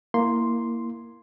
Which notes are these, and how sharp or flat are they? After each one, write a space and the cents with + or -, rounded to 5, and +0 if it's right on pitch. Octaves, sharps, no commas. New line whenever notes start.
A#3 +0 E4 +0 C6 +0